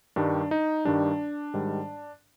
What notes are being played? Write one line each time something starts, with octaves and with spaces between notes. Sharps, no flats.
G2 D#3 G3 D4
D#4
G2 D#3 G3 D4
G#2 D#3 G3